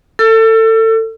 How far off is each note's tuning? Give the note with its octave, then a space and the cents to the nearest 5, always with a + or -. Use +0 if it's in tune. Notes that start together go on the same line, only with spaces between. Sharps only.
A4 +25 E6 +40